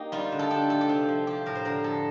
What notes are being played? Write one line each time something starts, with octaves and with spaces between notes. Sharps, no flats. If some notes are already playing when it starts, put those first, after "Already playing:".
Already playing: A#3 D#4 G4
G3 F4
D3
A4
D4 G4
A3 A4
G4
C3 F4
F3
F3 G4
A2 A#4
C5
D3 A#4
F2 A4